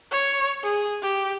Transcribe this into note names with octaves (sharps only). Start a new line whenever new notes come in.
C#5
G#4
G4